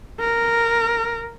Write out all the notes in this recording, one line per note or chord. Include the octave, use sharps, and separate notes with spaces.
A#4